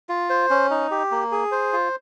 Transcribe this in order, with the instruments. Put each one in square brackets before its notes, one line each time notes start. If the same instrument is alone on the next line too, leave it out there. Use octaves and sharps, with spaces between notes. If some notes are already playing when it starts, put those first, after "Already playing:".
[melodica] F4
C5
C#4
D#4
G4
A#3
G#4
C5
F4